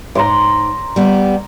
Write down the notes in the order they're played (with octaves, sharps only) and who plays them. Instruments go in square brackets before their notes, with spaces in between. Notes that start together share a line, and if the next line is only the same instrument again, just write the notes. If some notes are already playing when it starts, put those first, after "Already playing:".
[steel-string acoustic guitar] G#2 [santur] A#5 C6 D6
[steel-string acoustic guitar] G3 B3